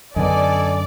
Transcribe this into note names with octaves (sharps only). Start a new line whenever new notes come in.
F#2 D3 B3 A4 D5 D#5 G#5